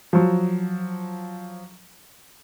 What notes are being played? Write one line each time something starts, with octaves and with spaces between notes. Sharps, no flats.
F3 F#3